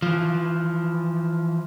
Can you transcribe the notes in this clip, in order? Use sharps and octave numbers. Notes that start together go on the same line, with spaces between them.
E3 F3